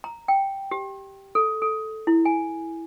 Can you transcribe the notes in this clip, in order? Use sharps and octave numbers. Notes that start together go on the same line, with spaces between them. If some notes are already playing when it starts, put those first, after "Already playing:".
A#5
G5
G4
A4
A4
E4
G#5